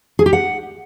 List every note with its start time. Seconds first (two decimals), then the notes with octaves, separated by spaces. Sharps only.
0.19 G#4
0.26 G4
0.33 F#5